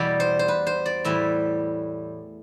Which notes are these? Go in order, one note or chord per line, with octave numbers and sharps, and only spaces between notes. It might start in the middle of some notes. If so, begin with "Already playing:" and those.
Already playing: E2 B2 G3 D5 E5
C5
C5
B4
C5
D5
A2 E3 G3 E5